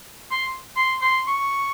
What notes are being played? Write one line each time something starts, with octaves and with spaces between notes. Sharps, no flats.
C6
C6
C6
C#6